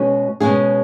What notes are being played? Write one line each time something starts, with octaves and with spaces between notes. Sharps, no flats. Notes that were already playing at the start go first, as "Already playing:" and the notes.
Already playing: B2 G#3 C#4
B2 G#3 C#4 G#4